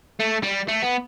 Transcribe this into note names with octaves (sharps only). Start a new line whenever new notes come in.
A3
G3
A3
B3